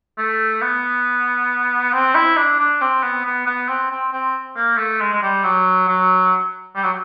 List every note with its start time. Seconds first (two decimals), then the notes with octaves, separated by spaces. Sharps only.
0.18 A3
0.62 B3
1.93 C4
2.15 E4
2.37 D4
2.59 D4
2.81 C4
3.03 B3
3.25 B3
3.47 B3
3.68 C4
3.91 C4
4.13 C4
4.56 A#3
4.78 A3
5.00 G#3
5.13 G#3
5.22 G3
5.44 F#3
5.88 F#3
6.76 G3
6.83 F#3